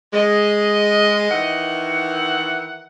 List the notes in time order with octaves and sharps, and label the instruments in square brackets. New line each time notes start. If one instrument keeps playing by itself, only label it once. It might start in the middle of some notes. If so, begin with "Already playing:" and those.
[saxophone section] G#3 [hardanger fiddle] D#5
[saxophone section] D#3 E3 F#5